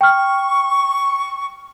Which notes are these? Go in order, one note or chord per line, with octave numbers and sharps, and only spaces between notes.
G5 C#6 F6